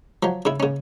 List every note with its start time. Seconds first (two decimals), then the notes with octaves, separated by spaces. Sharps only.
0.23 F3 F#3
0.45 C#3 E4
0.60 C#3 C#4